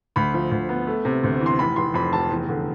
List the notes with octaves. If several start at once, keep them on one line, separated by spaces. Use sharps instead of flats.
D2 B5
F3
D2
B3
A3
C3
D2
E3
C6
F1 B5
F1 C6
F2 B5
F1 A5
E2
D3